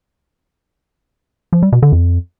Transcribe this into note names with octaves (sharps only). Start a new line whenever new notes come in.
F3
G3
B2
D3
F2